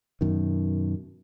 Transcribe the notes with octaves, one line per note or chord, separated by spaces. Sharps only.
F#2 B2 D#3